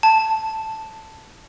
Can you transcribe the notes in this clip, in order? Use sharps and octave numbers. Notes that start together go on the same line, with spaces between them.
A5